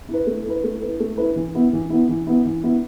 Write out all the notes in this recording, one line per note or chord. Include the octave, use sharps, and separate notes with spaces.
E4
B4
A3
E4 B4
A3
E4 B4
A3
E4 B4
E3
B3 E4
E3
B3 E4
E3
B3 E4
E3
B3 E4